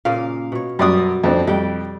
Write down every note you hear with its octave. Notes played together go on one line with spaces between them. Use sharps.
A#2 C#3 A#3 F5
B2 C#5
F#2 G3 F#4 D5 D#6
F2 C4 D4
F2 G3 G5